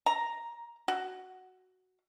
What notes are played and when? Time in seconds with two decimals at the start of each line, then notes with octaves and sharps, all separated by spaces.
0.06 A#5
0.88 F#4